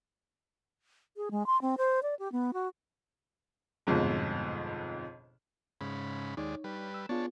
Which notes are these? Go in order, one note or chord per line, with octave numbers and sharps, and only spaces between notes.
G#4
G#3
C6
C4
C5
D5
G4
B3
F#4
G1 F2 G#2 B2
G#2 C#3 B5
D#2 G#3 D#4 C#5 D5
G3 B4
E6
B3 D4 F4 G#4 C#5 A5